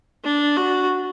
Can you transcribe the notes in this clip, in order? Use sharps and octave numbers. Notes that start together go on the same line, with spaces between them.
D4
F#4